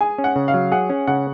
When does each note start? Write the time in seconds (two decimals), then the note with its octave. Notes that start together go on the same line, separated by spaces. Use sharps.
0.01 G#4 G#5
0.18 C#4
0.24 F#5
0.36 C#3
0.48 F5
0.54 F#3
0.72 G#4 F#5
0.90 C#4
1.07 C#3 F#5